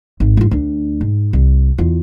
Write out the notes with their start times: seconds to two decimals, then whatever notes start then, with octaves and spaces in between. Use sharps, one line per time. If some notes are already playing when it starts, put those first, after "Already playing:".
0.20 G#1
0.37 G#2 F4
0.51 D2 D4
1.01 G#2
1.33 C2
1.78 E2 F4